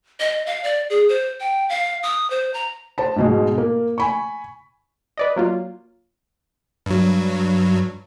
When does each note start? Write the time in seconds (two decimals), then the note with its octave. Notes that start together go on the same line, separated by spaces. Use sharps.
0.20 D#5
0.46 F5
0.64 D5
0.90 G#4
1.09 C5
1.40 G5
1.69 F5
2.03 D#6
2.30 C5
2.54 A#5
2.98 C5 A5
3.16 G#2 B2 G#3
3.58 A#3
3.98 G#5 B5 C#6
5.17 B4 D5 D#5
5.36 F#3 A#3 F4
6.86 G2 F#3